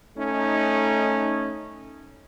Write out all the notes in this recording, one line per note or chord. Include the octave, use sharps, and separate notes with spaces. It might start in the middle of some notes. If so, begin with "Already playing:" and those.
A3 C#4 D#4